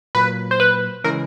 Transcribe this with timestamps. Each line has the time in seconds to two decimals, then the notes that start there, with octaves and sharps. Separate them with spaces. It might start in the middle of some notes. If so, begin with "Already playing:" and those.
0.15 A#2 F#3 A#3 B4
0.51 C5
0.60 B4
1.04 C#3 E3 G#3 C#4 E4 A#4